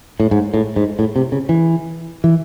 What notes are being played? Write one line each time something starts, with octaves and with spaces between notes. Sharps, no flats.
A2
G#2
A2
G#2
A2
C3
C#3
E3
E3